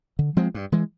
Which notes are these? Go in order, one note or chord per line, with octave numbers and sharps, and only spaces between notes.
D3
F3 G#3 C4
G2
E3 G#3